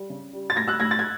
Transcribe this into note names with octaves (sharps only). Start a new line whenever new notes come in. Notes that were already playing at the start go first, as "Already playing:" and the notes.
Already playing: G3
C#3
G3
A6
A2 G#6 A#6
E6 F#6
A2 G#6 A#6
A6
G#6